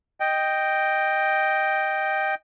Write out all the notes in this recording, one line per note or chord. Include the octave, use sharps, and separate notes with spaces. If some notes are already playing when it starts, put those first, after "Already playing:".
D#5 G5